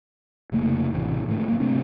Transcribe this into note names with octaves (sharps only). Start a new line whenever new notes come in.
F1 C#3 A3 A#3
A1 G2 C3 E3
G#2 D3 A3
F#3 A#3
C3 A3 C4 D4